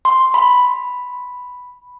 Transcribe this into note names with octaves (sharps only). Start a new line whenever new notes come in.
C6
B5